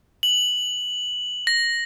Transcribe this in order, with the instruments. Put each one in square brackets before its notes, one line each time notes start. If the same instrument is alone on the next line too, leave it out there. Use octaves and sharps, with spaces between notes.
[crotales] F#7
A#6